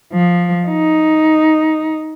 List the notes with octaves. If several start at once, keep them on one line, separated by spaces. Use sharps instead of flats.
F3
D#4